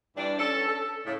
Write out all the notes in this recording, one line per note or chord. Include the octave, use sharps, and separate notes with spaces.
G2 E3 G3 D4
C#4 A4
A4
A2 C#3